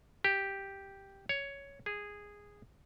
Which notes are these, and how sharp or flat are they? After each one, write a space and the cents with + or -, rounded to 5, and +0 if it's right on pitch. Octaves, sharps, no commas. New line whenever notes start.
G4 +0
C#5 +10
G#4 -10